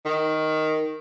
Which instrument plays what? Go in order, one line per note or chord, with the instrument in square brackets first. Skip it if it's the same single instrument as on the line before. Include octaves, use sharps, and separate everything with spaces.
[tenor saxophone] D#3